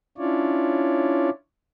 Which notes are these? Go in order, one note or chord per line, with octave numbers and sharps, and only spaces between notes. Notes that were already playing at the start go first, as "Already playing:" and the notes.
C#4 D4 E4 F4 C#5 D5